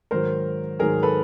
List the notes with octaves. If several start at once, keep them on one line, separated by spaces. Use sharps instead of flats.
G#2 D#3 F#3 A#4 C5
G#2 D#3 F#3 G#4 A#4
A4 B4